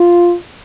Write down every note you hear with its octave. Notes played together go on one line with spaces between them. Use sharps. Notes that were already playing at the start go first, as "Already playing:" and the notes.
Already playing: F4